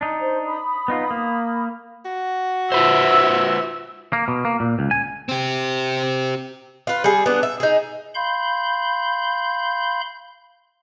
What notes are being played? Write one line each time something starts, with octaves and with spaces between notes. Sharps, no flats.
D4 D#4
C5
B5 D#6
B3 D#4 F4
A#3
F#4
F4 B4 C5 E5
A#3
B2
A#3
A#2
C#2
G#5
C4 G4
F4 B4
G3 G#4
B3 D4
E5
D#4 G#4
F5 B5 C6 G6